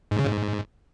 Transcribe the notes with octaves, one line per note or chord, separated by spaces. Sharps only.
G#2
C#3
G#2